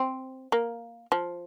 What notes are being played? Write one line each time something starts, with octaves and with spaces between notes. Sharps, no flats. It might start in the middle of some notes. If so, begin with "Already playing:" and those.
Already playing: C4
A#3
F3